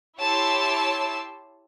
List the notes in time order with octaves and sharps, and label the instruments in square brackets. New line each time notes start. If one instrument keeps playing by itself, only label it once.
[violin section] E4 G4 C#5 A5 C6 E6